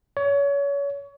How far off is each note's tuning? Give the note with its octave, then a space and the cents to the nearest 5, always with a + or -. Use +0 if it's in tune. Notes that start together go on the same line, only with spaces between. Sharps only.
C#5 +30